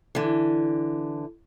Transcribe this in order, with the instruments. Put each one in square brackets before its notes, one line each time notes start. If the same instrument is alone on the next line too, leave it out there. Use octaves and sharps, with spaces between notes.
[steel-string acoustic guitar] D3 E3